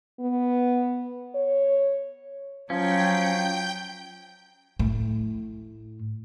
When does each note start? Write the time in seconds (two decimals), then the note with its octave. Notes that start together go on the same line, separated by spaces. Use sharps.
0.20 B3
1.35 C#5
2.70 F3 F#3 C#4 G5 G6
4.79 A2